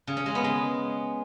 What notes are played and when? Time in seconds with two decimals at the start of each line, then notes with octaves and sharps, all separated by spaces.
0.07 C#3
0.17 C#4
0.26 G#3
0.35 B3
0.44 G#3